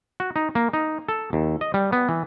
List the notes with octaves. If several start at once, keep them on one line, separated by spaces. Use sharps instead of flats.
F#4
D#4
A#3
D#4
A4
D#2
D#5
G3
B3
E3